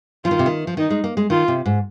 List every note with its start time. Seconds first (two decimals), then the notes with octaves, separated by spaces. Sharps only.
0.25 F3 F4
0.31 D#3
0.39 C3
0.46 D#3
0.67 F3
0.77 D#3 D#4
0.90 G#3
1.04 A#3
1.17 G#3
1.30 D#3 F4
1.48 C3
1.65 G#2